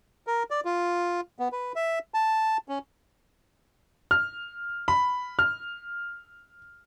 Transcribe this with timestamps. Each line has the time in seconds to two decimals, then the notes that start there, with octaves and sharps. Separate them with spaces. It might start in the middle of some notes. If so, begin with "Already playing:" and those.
0.27 A#4
0.51 D5
0.65 F4
1.39 B3
1.52 B4
1.76 E5
2.14 A5
2.69 C#4
4.11 F6
4.88 B5
5.39 F6